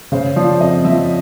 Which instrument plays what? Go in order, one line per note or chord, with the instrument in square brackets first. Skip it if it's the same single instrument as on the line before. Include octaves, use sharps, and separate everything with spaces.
[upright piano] C#3 [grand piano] C5
[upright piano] F3 [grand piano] D5
[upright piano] F2 [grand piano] D#5
[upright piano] F3 [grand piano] E5